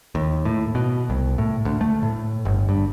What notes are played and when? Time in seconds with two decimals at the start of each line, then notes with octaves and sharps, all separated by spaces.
0.15 D#2
0.45 A2
0.75 B2
1.10 C2
1.38 A2
1.65 D2
1.81 A3
2.03 A2
2.45 G1
2.69 G2